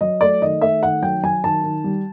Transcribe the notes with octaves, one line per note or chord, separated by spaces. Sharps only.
F#3 D#5
A3 D5
D#3 D#5
A3 E5
D#3 F#5
F#3 G5
F#3 G#5
D#3 A5
D#3
G3